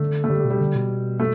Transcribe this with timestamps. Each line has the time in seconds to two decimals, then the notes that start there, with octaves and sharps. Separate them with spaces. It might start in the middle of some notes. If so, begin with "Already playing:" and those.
Already playing: D3 A3
0.24 A3
0.29 D3 G3
0.40 G3
0.45 B2
0.50 G3
0.60 D3
0.75 B2
1.19 A3